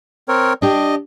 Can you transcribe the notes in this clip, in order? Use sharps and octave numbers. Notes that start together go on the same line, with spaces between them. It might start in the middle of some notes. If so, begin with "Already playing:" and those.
C4 A#4 C#5
D4 G4 D#5